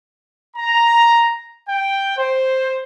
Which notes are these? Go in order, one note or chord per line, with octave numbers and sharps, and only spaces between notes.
A#5
G5
C5